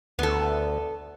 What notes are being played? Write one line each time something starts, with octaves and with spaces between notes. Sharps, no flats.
D2 B3 A4